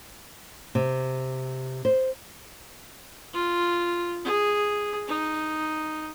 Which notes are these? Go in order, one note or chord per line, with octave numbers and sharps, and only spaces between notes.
C3
C5
F4
G#4
D#4